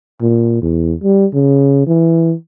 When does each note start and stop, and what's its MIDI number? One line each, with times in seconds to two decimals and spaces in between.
0.21 0.58 46
0.62 0.94 40
1.04 1.26 55
1.34 1.84 49
1.87 2.34 52